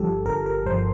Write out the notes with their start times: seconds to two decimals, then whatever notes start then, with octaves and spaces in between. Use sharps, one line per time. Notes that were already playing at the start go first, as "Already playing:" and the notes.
Already playing: G1 G2 F3 G4 A4
0.26 G1 A#4
0.46 A#4
0.65 G2 F3 C5